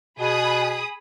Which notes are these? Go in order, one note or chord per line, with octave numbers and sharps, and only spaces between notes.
B2 G#4 B5 D#6